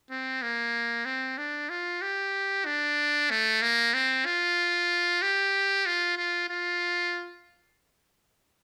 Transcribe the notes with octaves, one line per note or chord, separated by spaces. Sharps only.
C4
A#3
C4
D4
F4
G4
D4
A3
A#3
C4
F4
G4
F4
F4
F4